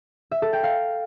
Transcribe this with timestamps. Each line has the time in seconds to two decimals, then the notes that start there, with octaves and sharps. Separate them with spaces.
0.31 E5
0.42 A4
0.53 G5
0.63 F5